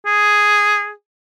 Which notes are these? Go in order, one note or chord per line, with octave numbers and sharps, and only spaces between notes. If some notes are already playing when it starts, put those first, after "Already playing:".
G#4